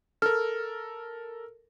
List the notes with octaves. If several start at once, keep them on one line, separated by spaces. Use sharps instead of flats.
A4 A#4 F6